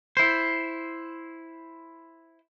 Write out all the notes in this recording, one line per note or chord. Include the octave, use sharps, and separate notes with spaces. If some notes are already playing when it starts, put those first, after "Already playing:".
E4 C5